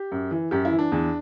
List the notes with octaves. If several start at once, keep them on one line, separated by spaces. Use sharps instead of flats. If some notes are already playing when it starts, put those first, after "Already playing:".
Already playing: G4
F#2
E3
F#2 G4
E4
E3
D4
E2